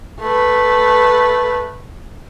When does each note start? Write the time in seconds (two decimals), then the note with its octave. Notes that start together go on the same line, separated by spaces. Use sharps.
0.21 A3 B4